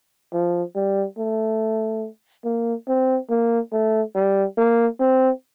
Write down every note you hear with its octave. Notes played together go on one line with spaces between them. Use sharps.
F3
G3
A3
A#3
C4
A#3
A3
G3
A#3
C4